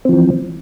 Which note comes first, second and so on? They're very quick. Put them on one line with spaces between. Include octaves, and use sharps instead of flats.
C4 F3 E3